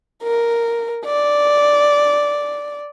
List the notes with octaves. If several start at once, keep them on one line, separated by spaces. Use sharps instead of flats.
A#4
D5